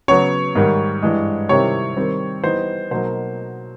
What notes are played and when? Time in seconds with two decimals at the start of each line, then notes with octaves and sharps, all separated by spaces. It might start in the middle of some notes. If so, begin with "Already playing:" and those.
0.08 C#3 F#3 B3 C#5
0.55 G#2 D#3 G3
1.03 G2 E3 G#3
1.49 C3 D#3 G3 C4 E4 C#5
1.97 D#3 G3 C4
2.43 E3 G3 B3 D#4 C5
2.91 B2 F#3 A#3 D#4 C5